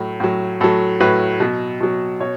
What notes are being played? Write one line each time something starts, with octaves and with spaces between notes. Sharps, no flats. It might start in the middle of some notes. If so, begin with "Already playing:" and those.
Already playing: A2 F#3
A2 F#3
A2 F#3 A4
A2 F#3 B4
B2 F#3
B2 F#3
B2 C#5